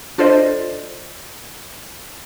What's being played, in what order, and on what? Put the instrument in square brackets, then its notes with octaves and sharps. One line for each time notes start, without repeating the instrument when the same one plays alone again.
[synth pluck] D4 F4 A4 C5 D5 D#5